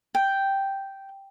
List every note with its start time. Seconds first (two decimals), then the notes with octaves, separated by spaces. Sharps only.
0.15 G5